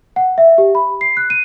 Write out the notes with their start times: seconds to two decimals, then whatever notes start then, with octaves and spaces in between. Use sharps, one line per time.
0.16 F#5
0.38 E5
0.58 G4
0.75 B5
1.01 C7
1.17 F#6
1.30 D#7